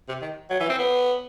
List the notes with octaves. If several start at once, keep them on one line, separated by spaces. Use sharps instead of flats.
C3
D#3
F#3
E3
C4
B3